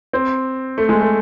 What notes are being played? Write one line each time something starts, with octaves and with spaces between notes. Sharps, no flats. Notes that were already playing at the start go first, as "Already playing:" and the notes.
C4
A3
G#3
A3